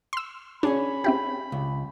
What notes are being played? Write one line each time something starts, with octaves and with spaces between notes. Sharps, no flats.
C6 E6
C#4 D4 G#4 C#5 B5
C4 E4 G4
C#2